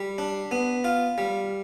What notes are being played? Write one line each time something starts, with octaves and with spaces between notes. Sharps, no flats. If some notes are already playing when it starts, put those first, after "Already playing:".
Already playing: G3
D4
B3
F4
G3